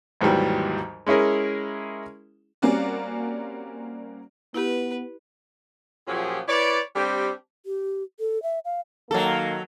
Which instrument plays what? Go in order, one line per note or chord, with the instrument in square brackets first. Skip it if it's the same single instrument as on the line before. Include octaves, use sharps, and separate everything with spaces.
[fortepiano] G#1 D#2 G#2 E3 F#3 G3
G#3 C#4 E4 G#4 A#4
[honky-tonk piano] G3 A#3 C4 C#4 F#4 D5
[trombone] B3 [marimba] E4 G4 [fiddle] B4
[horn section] A#2 F3 F#3 C#4 G4 G#4
E4 B4 C#5 D5
G3 C4 D4 G4
[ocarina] G4
A4
E5
F5
[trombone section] D#3 A#3 [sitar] F#3 A4